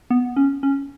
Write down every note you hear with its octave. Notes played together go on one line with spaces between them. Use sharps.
B3
C#4
C#4